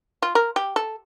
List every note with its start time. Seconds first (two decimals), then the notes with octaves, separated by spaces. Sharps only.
0.22 F4
0.35 A#4
0.56 G4
0.76 A4